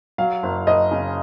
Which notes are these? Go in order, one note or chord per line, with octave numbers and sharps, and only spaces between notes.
F#3 F5
F#1
F#1 D#5
C#3